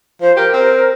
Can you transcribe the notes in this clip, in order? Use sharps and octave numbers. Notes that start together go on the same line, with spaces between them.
F3 C5
G4 A#4
C4